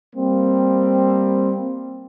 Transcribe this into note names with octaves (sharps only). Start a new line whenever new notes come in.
G3 A#3 C4